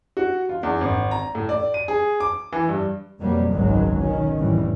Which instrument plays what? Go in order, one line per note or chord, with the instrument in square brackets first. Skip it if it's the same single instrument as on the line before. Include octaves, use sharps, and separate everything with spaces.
[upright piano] F#4
F4
E2
G#1
A#5
A2
D5
D#7
G#4
D6
E3
G2
[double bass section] F2 B2 F#3 G3 A#3
G#1 C#2 F#2 D#3 F#3 G#3
B2 D#3 C#4
F1 A2 E3 G3